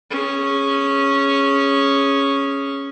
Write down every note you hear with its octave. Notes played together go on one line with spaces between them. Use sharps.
C#4 G#4